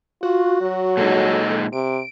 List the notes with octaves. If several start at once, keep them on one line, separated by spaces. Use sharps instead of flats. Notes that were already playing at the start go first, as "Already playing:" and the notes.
F4 F#4
F#3
A#2 G#3 D#4 A4
C3 D7